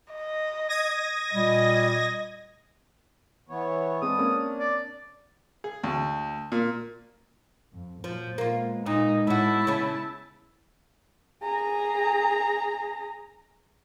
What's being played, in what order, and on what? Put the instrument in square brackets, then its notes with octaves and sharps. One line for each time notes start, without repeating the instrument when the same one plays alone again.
[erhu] D#5
[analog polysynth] D#6 G#6 A#6
[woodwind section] A#2 G3 [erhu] D#5
[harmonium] E3 B3 C#5
[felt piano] G#3 B3 C4 [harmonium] D4 [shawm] D#6
[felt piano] A#3 C4 C#4
[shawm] D5
[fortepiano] G#4
D2
A#2
[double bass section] F2
[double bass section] A#2 F#3 [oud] F3
[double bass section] G#3 B3 [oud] A#3 F4
[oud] A#2 [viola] D#4
[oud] A2 F#4 [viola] E4 A5
[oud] C#3 C#4
[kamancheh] G#4 A#5